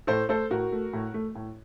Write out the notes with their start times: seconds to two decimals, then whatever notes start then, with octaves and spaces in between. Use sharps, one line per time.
0.07 A2 A4 C5
0.29 A3 A4 C5
0.50 A2 F#4 A#4
0.72 A3
0.93 A2
1.14 A3
1.35 A2